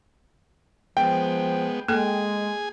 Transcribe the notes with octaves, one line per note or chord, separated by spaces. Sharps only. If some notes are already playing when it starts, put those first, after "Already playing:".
F3 G#3 B3 G5
G#3 A#3 G#4 A4 G#5